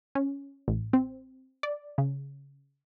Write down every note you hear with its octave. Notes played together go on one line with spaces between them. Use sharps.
C#4
A1
C4
D5
C#3